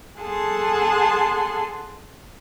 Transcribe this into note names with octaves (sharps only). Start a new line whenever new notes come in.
G#4 A4 F#5 A5 C6